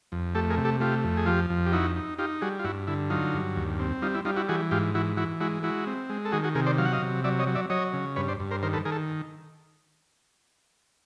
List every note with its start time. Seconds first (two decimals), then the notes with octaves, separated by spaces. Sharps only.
0.12 F2
0.35 A3 G4 A4
0.50 G#4 A#4
0.58 C3
0.65 G4 A4
0.80 A3 F4 G4
1.04 F2
1.17 G#4
1.26 F3 F4 G4
1.50 F2
1.66 G4
1.72 D#4 E4 F#4
1.96 D#4
2.18 D#4 F4 G4
2.42 G3 F#4 G#4
2.59 F4
2.64 G2 E4 F#4
2.87 D3 E4
3.10 F#3 D#4 F4
3.34 G2
3.56 D#2
3.80 C4
4.02 G3 D#4 F4
4.15 E4
4.25 G3 D#4 F4
4.36 E4 F#4
4.49 E3 F#4 G#4
4.71 G#2 F4 G4
4.95 E3 E4 F#4
5.17 E3 E4 F#4
5.40 G#3 E4 F#4
5.63 G#3 E4 F#4
5.87 C4
6.10 G#3
6.25 A4
6.32 D#3 F#4 G#4
6.44 F#4 G#4
6.55 C3 G#4 A#4
6.66 C5 D5
6.78 F#3 F5
6.85 F#5
6.92 D#5 F5
7.02 C3
7.24 F#3 D5 E5
7.39 C#5 D#5
7.47 F#3
7.55 D5 E5
7.70 F#3 C#5 D#5
7.93 C#3
8.16 G2 B4 C#5
8.28 C5 D5
8.40 G2
8.51 A#4 C5
8.63 D#3 A#4 C5
8.73 A4 B4
8.85 D#3 G#4 A#4
8.92 A4